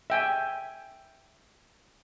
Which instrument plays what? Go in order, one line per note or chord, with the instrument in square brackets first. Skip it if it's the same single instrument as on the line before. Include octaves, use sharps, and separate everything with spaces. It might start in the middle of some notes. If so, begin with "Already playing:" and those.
[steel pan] E5 G5 G#5